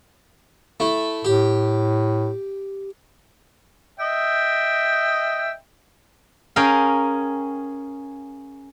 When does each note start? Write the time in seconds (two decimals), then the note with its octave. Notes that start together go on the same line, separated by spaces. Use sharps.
0.80 A3 E4
1.25 A2 G4
4.00 D#5 E5 G5
6.56 C#4 G#4 A#4 F5 G5